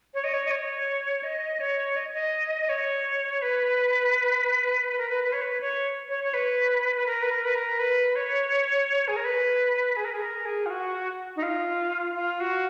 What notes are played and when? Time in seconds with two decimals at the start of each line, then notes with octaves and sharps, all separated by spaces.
0.14 C#5
0.24 D#5
0.33 C#5
0.45 D#5
0.51 C#5
1.23 D#5
1.60 C#5
1.96 D#5
2.14 D#5
2.61 D#5
2.69 C#5
3.42 B4
4.88 B4
4.98 A#4
5.09 B4
5.24 B4
5.32 C#5
5.41 B4
5.60 C#5
6.09 C#5
6.24 C#5
6.34 B4
6.96 B4
7.06 A#4
7.23 B4
7.31 A#4
7.45 B4
7.55 A#4
7.79 B4
8.16 C#5
9.08 G#4
9.16 A#4
9.24 B4
9.96 G#4
10.05 A#4
10.13 G#4
10.21 A#4
10.45 G#4
10.66 F4
10.70 F#4
11.36 D#4
11.43 F4
12.16 F4
12.40 F#4